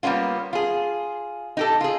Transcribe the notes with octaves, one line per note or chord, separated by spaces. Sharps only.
G3 A#3 B3 C#4 F4
F4 G#4
D#4 G4 A4
F4 G#4